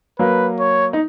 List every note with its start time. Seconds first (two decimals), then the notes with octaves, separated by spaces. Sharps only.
0.19 F#3 A#3 B4
0.60 C#5
0.93 D#4